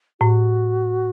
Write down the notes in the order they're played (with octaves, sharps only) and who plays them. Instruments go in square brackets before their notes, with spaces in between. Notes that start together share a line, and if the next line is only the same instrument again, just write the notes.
[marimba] A2 [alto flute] F#4